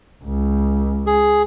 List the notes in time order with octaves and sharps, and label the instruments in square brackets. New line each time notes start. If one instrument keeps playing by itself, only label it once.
[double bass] C#2
[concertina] G#4